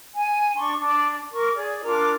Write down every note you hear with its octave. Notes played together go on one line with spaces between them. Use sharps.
G#5
D4 C6 C#6
D4
A#4 C#6 D6
G#4 D5
D4 F4 A#4 D6